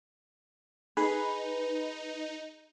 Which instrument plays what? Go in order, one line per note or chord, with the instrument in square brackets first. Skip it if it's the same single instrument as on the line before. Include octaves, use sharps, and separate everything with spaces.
[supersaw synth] D#4 [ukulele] G#4 [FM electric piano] B4